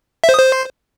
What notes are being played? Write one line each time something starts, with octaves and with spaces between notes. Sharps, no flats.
E5
C5
D#6
C5